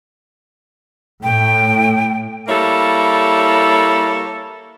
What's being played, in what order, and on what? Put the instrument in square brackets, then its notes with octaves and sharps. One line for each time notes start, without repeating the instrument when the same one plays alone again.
[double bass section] A2 [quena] G5
[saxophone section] G3 A#3 E4 A4 C#5